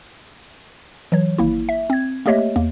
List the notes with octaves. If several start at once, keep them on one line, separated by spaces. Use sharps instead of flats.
E3 F#3 C#5
G#1 A#3 E4
E5
C4 G#6
A3 A#3 G4 C#5 D#5 E5
E2 A#3